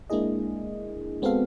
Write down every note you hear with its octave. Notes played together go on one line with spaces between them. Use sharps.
G#3 A#3 D4 E4 G#4 D#5
G#3 B3 C4 F#4 A4 F5